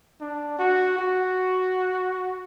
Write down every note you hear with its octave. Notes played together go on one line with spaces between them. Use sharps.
D4
F#4
F#4